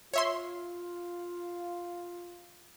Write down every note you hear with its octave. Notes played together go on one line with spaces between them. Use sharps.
F4 C#5 E5 C6